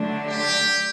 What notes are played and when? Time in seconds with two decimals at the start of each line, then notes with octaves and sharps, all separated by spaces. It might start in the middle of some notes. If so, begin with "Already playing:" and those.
Already playing: D3 F#3 A3 D4
0.29 G4